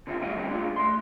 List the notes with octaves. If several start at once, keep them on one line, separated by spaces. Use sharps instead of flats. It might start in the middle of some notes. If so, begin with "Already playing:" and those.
D3 D#3 C4 F4
F#2 F#3 G3 A3 F#4 D#5
G#2 D3 G3 C4 C#4 G4
A#2 G#3 A3 D4 F4
A3 C6